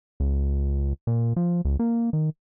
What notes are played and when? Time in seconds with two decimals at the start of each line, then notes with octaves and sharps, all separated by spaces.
0.20 C#2
1.07 A#2
1.36 F3
1.65 C#2
1.79 A#3
2.13 D#3